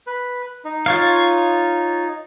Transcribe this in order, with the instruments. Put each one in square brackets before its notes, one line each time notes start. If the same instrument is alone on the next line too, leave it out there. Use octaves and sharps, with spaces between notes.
[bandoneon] B4
D#4
[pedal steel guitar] F4 C#5 F5